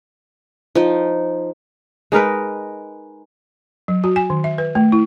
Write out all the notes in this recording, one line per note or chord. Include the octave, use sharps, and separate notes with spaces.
F3 D#4
G#3 D#4 A#4 B4
F#3
F#4
G#5
D#3
E5
B4
A3
E4